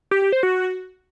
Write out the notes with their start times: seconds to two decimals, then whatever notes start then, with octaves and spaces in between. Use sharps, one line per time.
0.11 G4
0.22 G4
0.32 C5
0.43 F#4